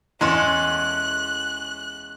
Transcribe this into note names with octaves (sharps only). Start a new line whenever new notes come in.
E2 G#3 C#4 A4 C6 F#6